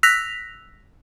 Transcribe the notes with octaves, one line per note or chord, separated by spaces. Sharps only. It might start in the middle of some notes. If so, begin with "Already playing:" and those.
E6 F#6 A#6 B6 F7